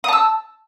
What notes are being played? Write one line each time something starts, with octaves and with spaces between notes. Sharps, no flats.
A5 D#6 E6